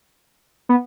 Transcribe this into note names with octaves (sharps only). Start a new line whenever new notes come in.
B3